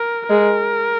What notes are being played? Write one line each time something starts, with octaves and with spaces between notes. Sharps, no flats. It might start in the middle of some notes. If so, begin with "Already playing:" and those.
Already playing: A#4
G#3 A#4